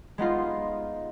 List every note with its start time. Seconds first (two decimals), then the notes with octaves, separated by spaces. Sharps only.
0.18 G#3 B3 D#4 F4